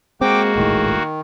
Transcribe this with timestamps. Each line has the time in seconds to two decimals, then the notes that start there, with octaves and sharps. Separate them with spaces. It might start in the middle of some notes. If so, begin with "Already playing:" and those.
0.21 G#3 A#3 C4 F#4 G5 D6
0.56 D#1 G#1 A2 D#3